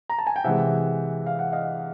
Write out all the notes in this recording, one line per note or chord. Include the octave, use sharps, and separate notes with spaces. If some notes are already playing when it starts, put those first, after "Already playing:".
A#5
A5
G#5
G5
C3 E3 G#3 E5 F#5
F5
F#5
D#5 F5